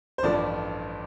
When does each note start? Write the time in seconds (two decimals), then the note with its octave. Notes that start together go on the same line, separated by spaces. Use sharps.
0.18 C5
0.23 A1 G2 F3 A3 D5